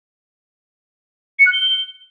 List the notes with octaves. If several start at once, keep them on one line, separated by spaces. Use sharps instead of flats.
C#7
F#6
G7